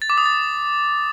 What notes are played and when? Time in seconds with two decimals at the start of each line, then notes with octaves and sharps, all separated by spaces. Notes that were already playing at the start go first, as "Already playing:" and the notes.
0.02 A6
0.10 D6
0.18 D#6
0.26 A6